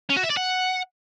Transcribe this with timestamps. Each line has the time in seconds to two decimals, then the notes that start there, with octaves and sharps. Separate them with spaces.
0.09 C#4
0.16 F#4
0.23 E5
0.30 D5
0.37 F#5